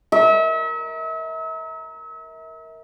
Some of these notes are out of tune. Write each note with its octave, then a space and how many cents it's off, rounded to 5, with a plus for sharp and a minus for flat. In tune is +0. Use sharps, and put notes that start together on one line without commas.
A#4 +0 E5 -40